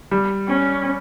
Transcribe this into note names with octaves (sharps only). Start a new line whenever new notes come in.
G3
C#4